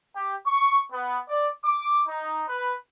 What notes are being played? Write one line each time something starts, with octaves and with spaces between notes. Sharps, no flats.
G4
C#6
B3
D5
D6
D#4
B4